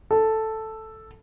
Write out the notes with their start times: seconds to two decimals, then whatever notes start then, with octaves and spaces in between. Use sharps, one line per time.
0.11 A4